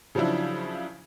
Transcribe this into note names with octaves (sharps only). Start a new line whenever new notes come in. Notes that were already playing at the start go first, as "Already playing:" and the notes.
C#3 F3 F#3 D4 E4